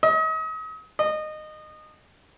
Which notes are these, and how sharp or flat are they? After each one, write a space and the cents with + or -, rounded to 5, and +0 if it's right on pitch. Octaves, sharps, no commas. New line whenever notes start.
D#5 +40
D#5 -20